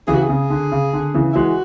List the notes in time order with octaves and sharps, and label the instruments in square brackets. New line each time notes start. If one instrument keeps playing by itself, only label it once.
[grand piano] C#3 E3 [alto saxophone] G#4
[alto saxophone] F#4
G#4
[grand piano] C#3
D3
C#3
D3
C#3 E3
[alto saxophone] E4
[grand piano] E3 G#3 [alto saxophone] F#4